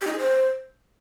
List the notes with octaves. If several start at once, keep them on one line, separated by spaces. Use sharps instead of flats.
G4
D#4
G#4
C5